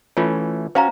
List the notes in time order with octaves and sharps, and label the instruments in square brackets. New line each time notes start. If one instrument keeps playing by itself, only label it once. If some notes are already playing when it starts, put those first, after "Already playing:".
[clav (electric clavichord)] E3 A3 C#4 [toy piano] F4
[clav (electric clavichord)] C#4 F#4 [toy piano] C5 F5 A#5